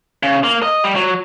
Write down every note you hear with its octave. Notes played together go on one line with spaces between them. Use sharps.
C#3
A#3
D#5
G3
F#3